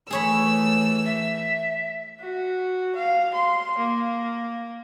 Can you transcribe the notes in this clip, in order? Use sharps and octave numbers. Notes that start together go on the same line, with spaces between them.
E3 A3 G#4 C#5 B5 E6
E5
F#4
F5
C6
A#3